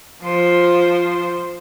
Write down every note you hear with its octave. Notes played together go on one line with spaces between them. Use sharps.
F3 C5